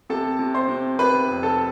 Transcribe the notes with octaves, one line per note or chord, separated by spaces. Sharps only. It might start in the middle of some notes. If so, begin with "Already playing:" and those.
C3 A4 A5
C3
C5 C6
C3
C3 B4 B5
F1
A4 A5